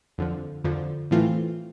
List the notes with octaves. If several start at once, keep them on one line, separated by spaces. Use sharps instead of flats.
F2 D3 F3
F2 D3 F3
A2 E3 A3 C4 F4